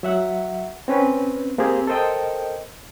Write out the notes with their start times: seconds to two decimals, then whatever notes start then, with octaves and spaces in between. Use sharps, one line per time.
0.03 F#3 E5 F#5
0.88 C4 C#4 B4
1.58 A#3 C4 G4 G#4
1.87 A4 A#4 C5 D#5 G5